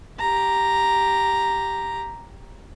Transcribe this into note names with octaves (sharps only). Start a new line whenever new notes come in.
G4 A#5